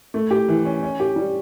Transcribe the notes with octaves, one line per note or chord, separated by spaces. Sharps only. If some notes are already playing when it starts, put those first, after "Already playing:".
A3
G4
E3
C#4
C#4
G4
G3